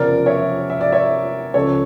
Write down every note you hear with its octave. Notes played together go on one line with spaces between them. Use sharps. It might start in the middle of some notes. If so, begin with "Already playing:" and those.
Already playing: F1 E2 C#3 F3 A#4 D5
C#5 E5
E5
D5
C#5 E5
C#2 C#3 F3 A4 C#5